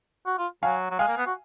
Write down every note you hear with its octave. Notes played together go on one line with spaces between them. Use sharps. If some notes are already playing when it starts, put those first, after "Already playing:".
F#4
F4
F#3 F5 G#5
F#3
G#3 F5 G#5
A#3
B3
F#4